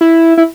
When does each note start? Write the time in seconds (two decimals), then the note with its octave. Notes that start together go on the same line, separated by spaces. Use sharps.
0.01 E4
0.37 E4